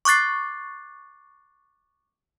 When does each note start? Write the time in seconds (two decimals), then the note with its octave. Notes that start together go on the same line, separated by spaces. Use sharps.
0.05 C#6 D6 F#6 A6 C7